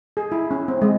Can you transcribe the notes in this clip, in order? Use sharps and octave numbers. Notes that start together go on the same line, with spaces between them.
G#4
E4
C#4
C4
G#3